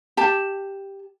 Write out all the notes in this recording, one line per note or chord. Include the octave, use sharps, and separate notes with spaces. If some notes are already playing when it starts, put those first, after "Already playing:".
G4 A5